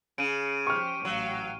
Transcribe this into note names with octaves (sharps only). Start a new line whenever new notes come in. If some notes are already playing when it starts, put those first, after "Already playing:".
C#3 D7 D#7
F3 G4 C5 C#6 F6
A1 F#3 F5 G5